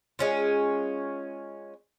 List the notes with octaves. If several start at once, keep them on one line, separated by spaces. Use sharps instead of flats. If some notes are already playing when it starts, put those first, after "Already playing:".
G#3 C#4 F4